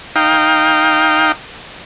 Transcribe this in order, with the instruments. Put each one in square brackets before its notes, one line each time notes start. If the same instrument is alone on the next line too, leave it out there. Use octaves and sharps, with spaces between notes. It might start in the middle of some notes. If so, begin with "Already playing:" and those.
[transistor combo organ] D#4 F5 G5